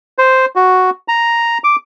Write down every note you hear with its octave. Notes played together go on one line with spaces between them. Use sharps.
C5
F#4
A#5
D6